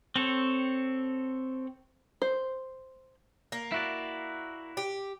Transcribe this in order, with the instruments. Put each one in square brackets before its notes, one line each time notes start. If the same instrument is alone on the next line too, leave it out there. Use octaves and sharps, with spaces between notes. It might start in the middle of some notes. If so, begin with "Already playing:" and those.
[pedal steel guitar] C4 A4 C#5
[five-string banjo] C5
[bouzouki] A#3
[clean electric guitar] E4 F#4 D5
[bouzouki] G4